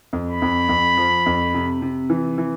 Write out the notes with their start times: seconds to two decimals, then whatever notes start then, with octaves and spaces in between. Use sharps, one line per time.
0.13 F2
0.27 B5
0.42 F2
0.69 F2
0.97 F3
1.26 F2
1.54 C3
1.82 C3
2.10 E3
2.38 E3